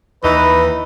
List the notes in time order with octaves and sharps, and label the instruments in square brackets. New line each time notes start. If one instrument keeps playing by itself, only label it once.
[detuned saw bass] D#2 [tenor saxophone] E3 [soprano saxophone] D#4 [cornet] B4